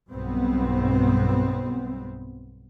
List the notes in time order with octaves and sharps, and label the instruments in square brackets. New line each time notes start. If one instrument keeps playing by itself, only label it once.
[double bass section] B1 G2 B3 C4